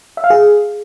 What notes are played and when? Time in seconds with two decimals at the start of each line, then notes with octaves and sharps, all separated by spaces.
0.17 E5
0.24 F5
0.30 G#4